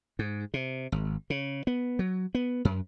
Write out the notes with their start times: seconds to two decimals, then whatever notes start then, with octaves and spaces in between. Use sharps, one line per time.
0.19 G#2
0.54 C3
0.92 G#1
1.30 C#3
1.67 B3
1.99 F#3
2.35 B3
2.65 F#2